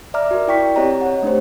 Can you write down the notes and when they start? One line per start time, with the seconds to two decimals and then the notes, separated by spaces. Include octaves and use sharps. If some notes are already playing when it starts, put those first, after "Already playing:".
0.14 D5 E5 A#5 D6 F6
0.31 F#4 A#4
0.47 E4 D5 G5 C#6 B6
0.76 C4 G4 C#5 D#5 A#5
1.01 C#5 F#5
1.23 A3 D4 G4 C5